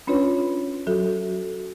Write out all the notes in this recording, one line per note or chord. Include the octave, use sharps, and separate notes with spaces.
C#4 D4 F4 B4 C#5
F#3 F#4 A4